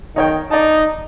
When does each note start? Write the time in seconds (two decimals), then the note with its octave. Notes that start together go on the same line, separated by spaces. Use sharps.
0.16 D#3 D#4 C#5 G5
0.51 D#4 D5 A5